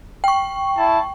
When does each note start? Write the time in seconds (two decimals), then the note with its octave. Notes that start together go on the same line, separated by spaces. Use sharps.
0.24 G5 C#6
0.77 E4 A5